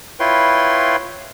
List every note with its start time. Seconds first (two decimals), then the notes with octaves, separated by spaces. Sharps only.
0.20 E4 F4 B4 C#5 G5 C6